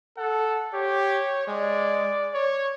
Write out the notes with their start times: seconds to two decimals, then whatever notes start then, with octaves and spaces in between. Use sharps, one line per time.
0.18 A4 F#5
0.73 G4 C#5
1.47 G#3 D5
2.34 C#5